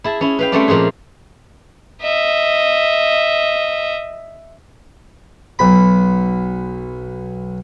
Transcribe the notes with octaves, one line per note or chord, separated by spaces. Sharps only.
E4 G#4 A5
C#4 E4
B4 F5 G5
G3 A3 C4 C#4 F#4 D5
A#2 F3 G#3 F4 G#4
D#5 E5
B1 B5